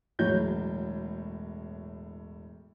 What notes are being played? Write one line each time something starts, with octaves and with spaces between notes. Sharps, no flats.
E1 A2 F#3 C#5 G6